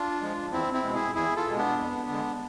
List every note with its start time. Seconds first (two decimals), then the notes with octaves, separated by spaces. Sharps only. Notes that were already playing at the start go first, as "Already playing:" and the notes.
Already playing: D4 F4
0.21 F3 G#3
0.52 E2 C4 E4
0.73 C4 E4
0.84 B2 G#3
0.94 E4 G#4
1.15 E2 E4 G#4
1.36 F4 A4
1.47 B2 G#3
1.57 B3 D4
1.78 F2
2.09 D3 G#3